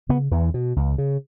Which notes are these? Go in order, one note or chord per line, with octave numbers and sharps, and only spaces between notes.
C#3 B3
E2 E3
B2
C#2
C#3